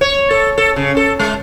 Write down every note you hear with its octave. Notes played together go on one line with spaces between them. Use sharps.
C#5
A4
A4
C#3
A4
G#3